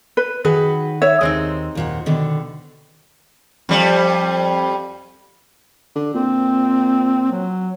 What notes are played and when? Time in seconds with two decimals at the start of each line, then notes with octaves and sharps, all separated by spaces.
0.17 B4
0.45 D#3 F#3 G#4 B4 F#5
1.02 C#5 E5
1.21 D#2 G#3 C4 D#4
1.75 D#2 A#2 F#5
2.06 B2 D3 D#3
3.69 F2 G3
5.95 D3
6.14 A#2 C4
7.32 F#3